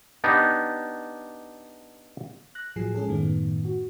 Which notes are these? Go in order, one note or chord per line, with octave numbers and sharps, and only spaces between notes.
B3 D4 D#4 G4
F#6 A#6
A2 F3 F#3 G#4 C7
G#3 C#4 G#4 A4
F#2 A2 D#3 A3 B3
F#4